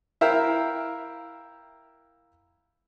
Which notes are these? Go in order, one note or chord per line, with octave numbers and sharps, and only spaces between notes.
E4 A#4 E5 F5 G5